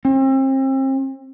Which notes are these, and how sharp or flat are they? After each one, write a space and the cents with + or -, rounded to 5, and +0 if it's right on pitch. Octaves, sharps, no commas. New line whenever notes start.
C4 +35